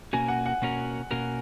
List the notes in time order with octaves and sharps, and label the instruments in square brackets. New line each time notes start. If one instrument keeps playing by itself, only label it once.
[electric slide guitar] B2 A#3 C#4 F#4 A#4 [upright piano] G#5
[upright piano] F#5
F#5
[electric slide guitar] B2 A#3 C#4 F#4 A#4
B2 A#3 C#4 F#4 A#4